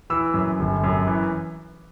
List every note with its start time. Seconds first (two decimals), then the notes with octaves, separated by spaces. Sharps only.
0.10 E3 E6
0.34 F#2
0.59 G1
0.83 F#2
1.07 E3